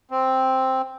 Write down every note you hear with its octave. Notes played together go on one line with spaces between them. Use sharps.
C4